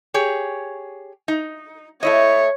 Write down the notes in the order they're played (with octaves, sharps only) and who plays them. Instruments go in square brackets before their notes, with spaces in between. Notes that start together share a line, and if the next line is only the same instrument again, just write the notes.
[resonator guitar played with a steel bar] G4 G#4 C#5
D#4
[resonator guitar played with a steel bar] A3 E4 D#5 [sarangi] C#5